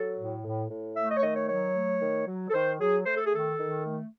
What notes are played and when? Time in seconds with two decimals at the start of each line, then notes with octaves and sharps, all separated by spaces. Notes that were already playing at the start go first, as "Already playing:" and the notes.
Already playing: F#3 A4
0.18 A2
0.44 A2
0.70 A2
0.97 A3 E5
1.10 D#5
1.16 C#5
1.23 D#3 D#5
1.36 C#5
1.49 F#3 C#5
1.75 A3
2.02 D#3
2.28 F#3
2.50 A4
2.54 D#3 C5
2.80 F#3 G#4
3.06 A3 C5
3.16 A4
3.26 G#4
3.33 D#3 A4
3.59 D#3
3.85 A3